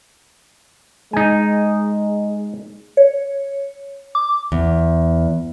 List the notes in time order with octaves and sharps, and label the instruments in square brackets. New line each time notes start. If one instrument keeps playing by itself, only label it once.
[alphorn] G#3 [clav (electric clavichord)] D#4 G#5
[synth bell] C#5
D6
[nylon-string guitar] E2